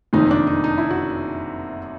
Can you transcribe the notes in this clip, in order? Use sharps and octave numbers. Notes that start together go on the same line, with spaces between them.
F#1 F2 C3 D#3 D#4
D4
D#4
D#4
E4
F#4